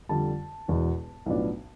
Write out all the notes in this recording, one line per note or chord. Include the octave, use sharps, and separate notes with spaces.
F2 D3 G3 A5
E1 E2 B2
B1 A2 F3 B3 D4